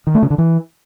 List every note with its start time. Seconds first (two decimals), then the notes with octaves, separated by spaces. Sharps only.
0.07 D#3
0.15 A3
0.23 C#3
0.30 D3
0.38 E3